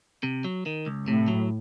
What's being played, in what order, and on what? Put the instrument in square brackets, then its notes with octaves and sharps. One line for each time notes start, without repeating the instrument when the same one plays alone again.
[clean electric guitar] C3
F#3
D#3
C#2
[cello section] A2 [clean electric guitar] C3
[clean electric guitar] F#3